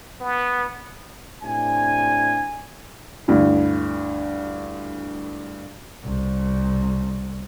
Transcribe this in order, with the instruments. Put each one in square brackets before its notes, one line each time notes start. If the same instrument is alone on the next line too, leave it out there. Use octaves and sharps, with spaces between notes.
[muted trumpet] B3
[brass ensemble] A2 C3 D4 G#5
[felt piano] D2 G2 E4
[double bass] C2